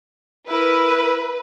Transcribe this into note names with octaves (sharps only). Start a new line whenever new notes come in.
E4 A#4 B4